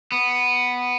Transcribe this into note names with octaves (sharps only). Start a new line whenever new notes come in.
B3